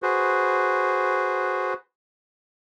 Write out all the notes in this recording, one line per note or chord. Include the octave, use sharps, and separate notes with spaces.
F#4 G#4 B4 C5